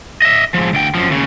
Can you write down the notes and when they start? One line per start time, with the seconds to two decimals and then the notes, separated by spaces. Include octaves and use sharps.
0.22 D#5 E5
0.54 F3 G#3
0.74 D2 G5
0.95 F#2 F3
1.10 D#2 C#3